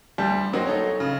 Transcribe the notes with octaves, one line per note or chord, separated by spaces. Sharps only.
D2 G3 A5 G6
F#3 A#3 C4 D#4 F#4
D#4 A4 C#5
C#3